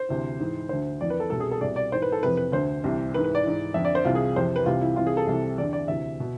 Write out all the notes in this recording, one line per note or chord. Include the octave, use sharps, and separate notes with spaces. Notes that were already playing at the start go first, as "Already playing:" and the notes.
Already playing: C5
D2 C3 E3
G#2 E3
D2 D3 C5
F2 E3 D5
B4
A4
C2 B2 A4
G#4
A4
C2 B2 D5
D5
G#2 E3 C5
B4
A4
F2 C3 E3 B4
B4
D2 D3 C5
C2 C3 E3
G#2 E3 B4
B4
D5
G#2 E3
F2 D3 E5
D5
C5
C2 C3 E3 F4
G#4
F2 C3 E3 C5
B4
C2 C3 E3 F4
E4
C2 C3 E3 F4
G#4
A4
C2 C3 E3
E2 D3 D5
D5
D2 C3 E3 E5
B2